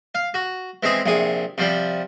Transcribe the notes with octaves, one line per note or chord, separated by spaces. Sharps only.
F5
F#4
E3 G#3 C4 G#4
A#1 C3 G#4
C3 F3 G3